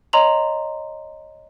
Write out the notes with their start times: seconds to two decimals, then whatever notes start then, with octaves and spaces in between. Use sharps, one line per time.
0.13 C#5 D#5 A#5 C6 F7 F#7